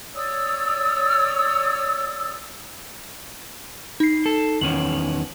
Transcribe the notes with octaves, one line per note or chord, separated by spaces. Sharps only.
C#5 D5 D#6 E6
D#4 C7
A4
E2 D#3 C#4 F#7